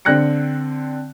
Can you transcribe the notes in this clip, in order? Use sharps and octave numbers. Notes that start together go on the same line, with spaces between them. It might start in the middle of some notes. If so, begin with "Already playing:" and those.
D3 C4 D4 F#6 A#6 C#7